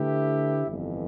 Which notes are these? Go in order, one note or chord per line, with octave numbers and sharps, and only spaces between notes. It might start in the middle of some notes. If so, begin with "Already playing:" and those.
Already playing: D3 A3 E4 G4 B4
G1 F2 E3